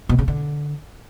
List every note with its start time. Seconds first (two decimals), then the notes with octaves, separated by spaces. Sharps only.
0.09 B2
0.19 C#3
0.28 D3